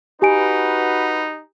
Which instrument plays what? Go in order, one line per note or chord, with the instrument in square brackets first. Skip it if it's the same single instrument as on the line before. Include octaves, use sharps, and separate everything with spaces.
[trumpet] D#4 [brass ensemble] F#4 B4 [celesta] G4 G#5 D7